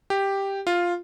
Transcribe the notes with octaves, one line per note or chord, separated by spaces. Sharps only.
G4
F4